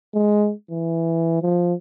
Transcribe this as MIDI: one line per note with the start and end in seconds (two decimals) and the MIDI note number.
0.14 0.52 56
0.71 1.39 52
1.42 1.74 53